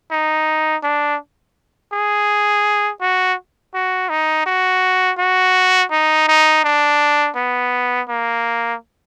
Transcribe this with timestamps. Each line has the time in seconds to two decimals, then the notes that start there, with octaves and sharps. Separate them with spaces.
0.11 D#4
0.83 D4
1.93 G#4
3.01 F#4
3.74 F#4
4.09 D#4
4.46 F#4
5.18 F#4
5.91 D#4
6.28 D#4
6.64 D4
7.36 B3
8.09 A#3